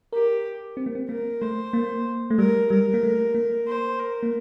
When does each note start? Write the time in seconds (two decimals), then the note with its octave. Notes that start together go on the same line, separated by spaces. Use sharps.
0.13 G4 A#4
0.77 C4
0.86 A#3
0.95 C4
1.09 A#3 A#4
1.41 A3 C5
1.73 A#3
2.30 A3
2.38 G3 A#4
2.70 G3 A#4
2.94 A#3
3.03 A3
3.35 A#3
3.67 C5
3.99 A#4
4.23 A#3